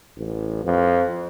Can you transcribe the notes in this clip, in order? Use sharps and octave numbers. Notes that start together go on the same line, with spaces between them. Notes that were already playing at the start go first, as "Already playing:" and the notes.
A1
F2